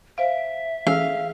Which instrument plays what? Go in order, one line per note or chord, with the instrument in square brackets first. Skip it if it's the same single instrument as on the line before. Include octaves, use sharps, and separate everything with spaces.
[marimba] C5 F5 [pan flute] E5 [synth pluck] D7
[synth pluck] E3 C#4 A4 [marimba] A3 G#4 E6 [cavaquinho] F5